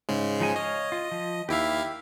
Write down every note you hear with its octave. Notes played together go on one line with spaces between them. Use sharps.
G#2 C#3 G#3
F3 D#4 G#5
C#5 D#5 F5
F4
F3
D#2 E4 G4 E5 F5